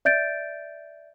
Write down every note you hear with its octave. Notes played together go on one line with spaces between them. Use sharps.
D5 E5 G6 A6 D7